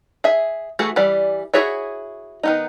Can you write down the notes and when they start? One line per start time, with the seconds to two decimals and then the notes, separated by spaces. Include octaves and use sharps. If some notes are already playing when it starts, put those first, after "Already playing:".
0.24 G#4 E5
0.79 E3 A3 F#4 G#4
0.96 E3 G3 D5
1.54 E4 F#4 G#4 C#5 E5
2.43 D#3 B3 D#4